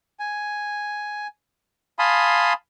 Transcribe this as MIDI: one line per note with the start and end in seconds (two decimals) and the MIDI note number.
0.19 1.27 80
1.99 2.53 77
1.99 2.53 80
1.99 2.53 81
1.99 2.53 83
1.99 2.53 84
1.99 2.53 87